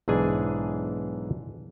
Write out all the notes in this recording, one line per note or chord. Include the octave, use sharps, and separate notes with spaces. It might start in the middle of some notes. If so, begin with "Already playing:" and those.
B1 G#2 E3 D4 G#4 G#5